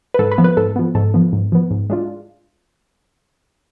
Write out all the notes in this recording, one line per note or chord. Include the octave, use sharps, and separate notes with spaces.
B4
G#2 A4
B4
F3 B3
B4
G#2 A4
F3 B3
G#2 A4
F3 B3
G#2
F3 B3
G#2
G#3 D4 F4